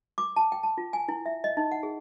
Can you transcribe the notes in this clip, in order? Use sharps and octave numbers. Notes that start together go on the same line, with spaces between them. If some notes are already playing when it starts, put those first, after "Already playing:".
D6
A5
G5
A5
F4
G#5
E4
E5
D#5
D#4
F#5
G#4